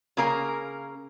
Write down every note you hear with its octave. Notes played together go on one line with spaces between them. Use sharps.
C#3 A#3 A#4 F5 G#5